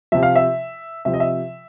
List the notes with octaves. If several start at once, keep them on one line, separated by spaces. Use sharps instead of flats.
C3 F3 E5
F5
E5
C3 F3 E5
D#5
E5